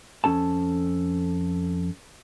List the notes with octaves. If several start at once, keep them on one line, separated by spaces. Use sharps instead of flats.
F2 C#4 A4 A5